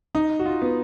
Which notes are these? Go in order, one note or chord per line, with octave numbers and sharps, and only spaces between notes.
D#4
F#4
F4
B3